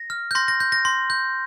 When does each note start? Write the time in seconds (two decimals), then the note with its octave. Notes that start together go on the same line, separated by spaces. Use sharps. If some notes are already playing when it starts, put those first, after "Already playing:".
Already playing: A#6
0.10 F6
0.31 G6
0.35 C6 A#6
0.48 A#6
0.60 G6
0.72 A#6
0.85 C6
1.10 G6